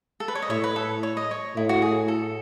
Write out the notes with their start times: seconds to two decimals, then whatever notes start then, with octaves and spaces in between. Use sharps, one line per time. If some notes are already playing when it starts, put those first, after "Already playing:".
0.20 A4
0.28 B4
0.35 C#5
0.42 D#5
0.50 A2 C#5 E5
0.64 B4
0.76 A4
1.03 C#5
1.17 D#5
1.31 C#5
1.56 A2 E4
1.69 F#4
1.82 G#4
2.08 A4